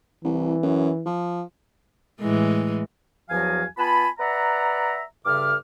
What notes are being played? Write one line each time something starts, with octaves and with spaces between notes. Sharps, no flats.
C2 E3
F#2
F3
A2 E3 G#3
E2 F3 F#3 F#4 F5 G#5
B3 F4 G#5 A5 B5
B4 D5 E5 F#5 A#5
G2 C#3 A4 E5 D6 F6